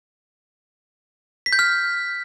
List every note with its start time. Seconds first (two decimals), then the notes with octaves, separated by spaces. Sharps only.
1.46 B6
1.53 G6
1.59 F6